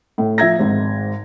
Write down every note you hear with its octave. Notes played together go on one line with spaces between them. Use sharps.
A2
F3 E5 G#6 A#6
G#1 G#2